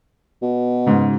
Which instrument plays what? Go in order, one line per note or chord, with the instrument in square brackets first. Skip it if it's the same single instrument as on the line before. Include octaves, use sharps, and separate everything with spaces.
[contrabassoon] B2
[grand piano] G#2 C#3